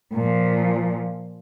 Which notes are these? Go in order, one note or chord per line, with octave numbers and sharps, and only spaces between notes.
A#2 F3